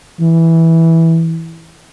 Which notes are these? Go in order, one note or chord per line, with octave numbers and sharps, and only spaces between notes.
E3